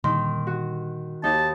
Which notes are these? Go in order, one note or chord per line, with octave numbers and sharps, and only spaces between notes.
A#2 D3 D#3 G3 C6
F#4
D#2 D#4 A5